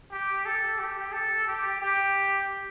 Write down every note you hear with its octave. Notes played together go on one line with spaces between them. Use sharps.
G4
A4
G4
A4
G4
G4